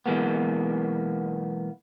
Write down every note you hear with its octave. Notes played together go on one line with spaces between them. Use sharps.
B1 E3 G#3 A#3 B3